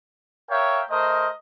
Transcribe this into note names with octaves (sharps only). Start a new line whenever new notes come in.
A#4 C#5 E5 F5 G5
A3 A#4 C5 D#5